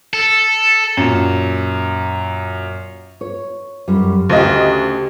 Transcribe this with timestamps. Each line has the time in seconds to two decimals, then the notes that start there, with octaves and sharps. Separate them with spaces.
0.13 A4
0.97 F#2 A#2
3.21 C#5
3.88 F#2 G3
4.29 D2 C#3 G4 D#5